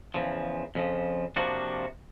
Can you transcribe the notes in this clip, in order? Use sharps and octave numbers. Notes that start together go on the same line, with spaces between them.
E2 C#3 F3
F2 C#3 F3
C3 F3 A#3 D4 F#4